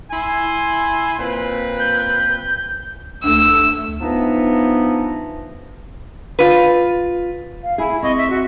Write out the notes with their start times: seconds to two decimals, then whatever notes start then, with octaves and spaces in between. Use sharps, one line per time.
0.12 E4 G#5 C6
1.19 A#2 C4 B4
1.79 G6
3.24 D2 A3 D4 E6
4.01 E3 F3 B3 D4 D#4
6.39 F4 B4
7.64 F5
7.78 E4 G#4 E5
8.02 C4 D#5 C#6
8.17 E5
8.30 F#4